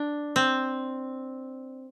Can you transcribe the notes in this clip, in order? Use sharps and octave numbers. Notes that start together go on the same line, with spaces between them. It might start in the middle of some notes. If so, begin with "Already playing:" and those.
Already playing: D4
C4